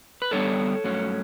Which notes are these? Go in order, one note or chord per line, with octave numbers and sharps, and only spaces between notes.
B4
G2 D3 G3 B3 D4 A4 C#5
G2 F#3 A3 C#4